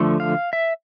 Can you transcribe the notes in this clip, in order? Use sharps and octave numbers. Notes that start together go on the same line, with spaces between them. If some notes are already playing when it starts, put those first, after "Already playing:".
Already playing: D3 F3 A3
F5
E5